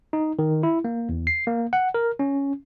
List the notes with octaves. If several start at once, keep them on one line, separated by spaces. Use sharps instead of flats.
D#4
D#3
E4
A#3
E2
C7
A#3
F#5
A#4
C#4